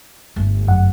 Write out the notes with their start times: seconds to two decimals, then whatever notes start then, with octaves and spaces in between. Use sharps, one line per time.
0.36 G1 A3
0.68 F#2 F#5